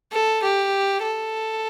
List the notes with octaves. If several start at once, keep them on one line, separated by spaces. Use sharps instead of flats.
A4
G4
A4